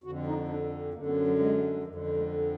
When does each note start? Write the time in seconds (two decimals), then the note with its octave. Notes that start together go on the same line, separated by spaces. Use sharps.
0.04 F2 D3 F#4
0.27 D#4
0.49 D4
0.94 F#2 D3 A#3
1.06 B3
1.28 F#3
1.39 G#3
1.83 F2 D3 F3
1.95 F#3
2.07 G#3
2.17 G#3